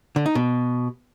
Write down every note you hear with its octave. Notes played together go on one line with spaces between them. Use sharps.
D3
D#4
B2